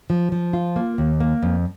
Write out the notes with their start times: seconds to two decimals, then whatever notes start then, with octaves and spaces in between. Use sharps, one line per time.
0.10 F3
0.32 F3
0.53 F4
0.76 A#3
0.98 D#2
1.20 A#3
1.43 F2